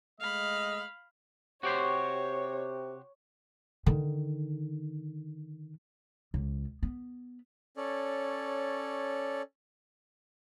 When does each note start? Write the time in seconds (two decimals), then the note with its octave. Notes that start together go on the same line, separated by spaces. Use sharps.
0.20 G#3 A3 D#5 F5 B5
1.63 C3 F#4 G4 C5 C#5
3.86 D3 D#3
6.34 C#2
6.83 B3
7.77 C#4 A4 C#5 D5